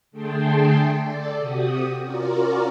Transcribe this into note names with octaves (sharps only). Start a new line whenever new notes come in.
D3 A3 G#4 G5 A5 C6
A4 D5
C3 F#4 G4 D#6
C#4 F4 F#4 A#4 D5